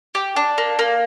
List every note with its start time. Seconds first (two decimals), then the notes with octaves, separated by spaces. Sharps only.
0.15 G4
0.36 D4
0.58 A#3
0.79 A#3